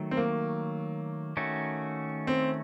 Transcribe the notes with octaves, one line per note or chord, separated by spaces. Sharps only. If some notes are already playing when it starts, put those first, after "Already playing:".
Already playing: D#3 F#3 A3
C4
A#3
D#3 A3 C#4 F#4
C4